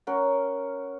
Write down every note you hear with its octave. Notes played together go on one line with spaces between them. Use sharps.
C#4 A#4 F#5